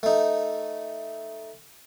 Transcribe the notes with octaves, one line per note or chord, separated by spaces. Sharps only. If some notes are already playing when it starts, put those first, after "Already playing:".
A3 D#4